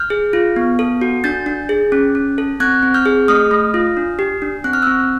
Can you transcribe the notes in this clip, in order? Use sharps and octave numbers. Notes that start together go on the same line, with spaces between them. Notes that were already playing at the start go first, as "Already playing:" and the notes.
Already playing: F6 G6
G#4
F4
B3
A4
F#4
D4 G6 A6
D4
G#4
C#4
C#4
A4
C4 F#6 G#6
C4
F6 G6
G#4
A3 D#6 F6
A3
F4
D4
G4
D4
C4 F#6
F6
C4 E6 F#6